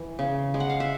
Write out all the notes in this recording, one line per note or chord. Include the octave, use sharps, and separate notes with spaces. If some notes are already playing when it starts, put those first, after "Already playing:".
Already playing: E3
C#3
G#3
F#5
F5
E5